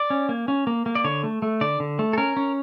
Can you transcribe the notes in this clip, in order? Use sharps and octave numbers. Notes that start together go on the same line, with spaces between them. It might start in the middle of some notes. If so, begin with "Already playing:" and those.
Already playing: D5
C#4
A#3
C#4
A#3
A#3
D5
D3 C#5
A3
A3
D3 D5
D3
A3
A4
C#4 A#4
C#4